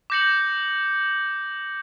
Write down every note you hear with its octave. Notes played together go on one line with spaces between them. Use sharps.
D6 G6 A#6 C#7 F#7